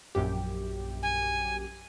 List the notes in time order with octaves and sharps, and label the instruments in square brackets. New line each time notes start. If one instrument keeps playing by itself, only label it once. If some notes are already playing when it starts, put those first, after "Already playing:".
[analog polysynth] A#1 F#2 G4
[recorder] G#5